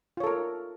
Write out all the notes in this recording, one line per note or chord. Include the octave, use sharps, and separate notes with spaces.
F4 A4 A#4 C#5